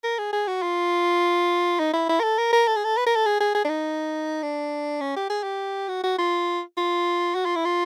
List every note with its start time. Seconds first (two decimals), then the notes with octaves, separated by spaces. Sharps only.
0.04 A#4
0.19 G#4
0.33 G#4
0.48 F#4
0.62 F4
1.79 D#4
1.94 E4
2.09 E4
2.20 A#4
2.23 A4
2.38 A#4
2.53 A#4
2.67 A4
2.76 G#4
2.84 A4
2.97 B4
3.07 A#4
3.16 A4
3.26 G#4
3.41 G#4
3.55 G#4
3.65 D4
3.69 D#4
4.43 D4
5.01 C#4
5.16 G4
5.30 G#4
5.43 G4
5.89 F#4
6.04 F#4
6.19 F4
6.77 F4
7.35 F#4
7.46 F4
7.56 E4
7.65 F4